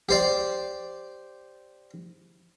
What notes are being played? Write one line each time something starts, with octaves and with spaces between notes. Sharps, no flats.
G4 C5 D5